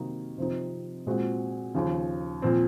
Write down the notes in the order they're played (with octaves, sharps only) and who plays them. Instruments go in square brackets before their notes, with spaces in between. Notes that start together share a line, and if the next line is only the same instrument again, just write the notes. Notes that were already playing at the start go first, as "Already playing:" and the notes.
Already playing: [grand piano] C3 D#3 F#3 A#3 D#4
C3 F3 C4 D#4
A#2 G#3 C4 F#4
D#2 C#3 F3
A#2 F3 C4